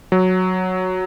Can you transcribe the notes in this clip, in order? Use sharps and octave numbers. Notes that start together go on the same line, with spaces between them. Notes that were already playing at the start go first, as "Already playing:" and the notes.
F#3